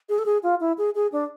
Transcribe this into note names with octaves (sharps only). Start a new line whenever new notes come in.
G#4
A4
G#4
F4
E4
G#4
G#4
D4